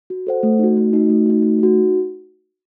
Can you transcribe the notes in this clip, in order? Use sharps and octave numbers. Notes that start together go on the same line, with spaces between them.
F#4
A4 C5 F#5
A3
D#4 F#4
A3
D#4 F#4
A3
D#4 F#4
A3
D#4 F#4